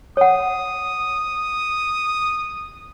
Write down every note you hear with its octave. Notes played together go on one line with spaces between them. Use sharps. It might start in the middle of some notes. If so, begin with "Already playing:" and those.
C#5 F#5 D#6